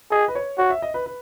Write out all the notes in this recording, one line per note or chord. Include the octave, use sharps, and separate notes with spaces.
G#4 D#5
B4
C#5
F#4 C#5
E5
D#5
B4
B4